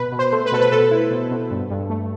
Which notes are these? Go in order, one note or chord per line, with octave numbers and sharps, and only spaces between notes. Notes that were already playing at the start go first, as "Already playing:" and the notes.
Already playing: B2 B4
B2
C5
A3
B4
B2 A4
B4
B2 A4
E4
B2
B2
G2
G2
A3